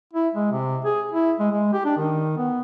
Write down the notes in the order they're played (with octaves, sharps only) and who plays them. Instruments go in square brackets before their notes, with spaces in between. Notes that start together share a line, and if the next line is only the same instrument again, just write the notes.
[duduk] E4
G#3
C3
G#4
E4
G#3
G#3
G4
D4
D#3
B3